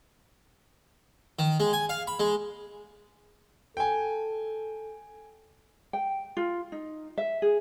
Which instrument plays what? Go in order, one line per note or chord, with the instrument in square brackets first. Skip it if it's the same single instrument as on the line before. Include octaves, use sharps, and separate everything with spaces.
[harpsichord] D#3
G#3
G#5
F5
B5
G#3
[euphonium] A4 [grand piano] G5 G#5
[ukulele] G5
F4
D#4
E5
G#4